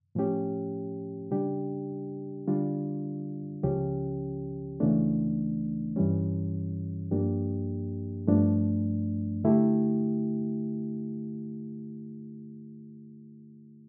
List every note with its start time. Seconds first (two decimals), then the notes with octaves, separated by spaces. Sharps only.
0.15 A2 F3 C#4 G4
1.31 C#3 G3 D4 G4
2.48 D3 G3 D4 F4
3.63 C#2 C#3 F3 C#4 G4
4.80 C#2 C#3 E3 A3 D4
5.96 G2 E3 G3 C#4
7.11 G2 F3 A#3 D4 G4
8.27 G2 F3 A3 D4
9.44 D3 A3 E4 G4